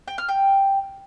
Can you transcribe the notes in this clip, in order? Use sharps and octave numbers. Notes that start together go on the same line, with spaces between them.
G5
F6
G5